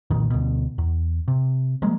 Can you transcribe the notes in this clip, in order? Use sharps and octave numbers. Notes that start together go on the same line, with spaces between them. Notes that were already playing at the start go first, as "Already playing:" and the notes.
C2 F2 A#2 D#3
D2 B2
E2
C3
F3 G3 G#3 A#3